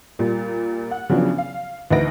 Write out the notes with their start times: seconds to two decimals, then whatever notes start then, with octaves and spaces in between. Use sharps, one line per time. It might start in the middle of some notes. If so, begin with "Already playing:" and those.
0.19 A#2 G3
0.91 F#5
1.09 C#3 F3 F#3 B3 D4
1.38 F5
1.91 D2 E3 D#4 B4 A#6 D7